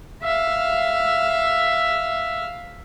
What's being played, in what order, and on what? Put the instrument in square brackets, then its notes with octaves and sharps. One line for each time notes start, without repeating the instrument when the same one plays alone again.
[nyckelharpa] E5 F5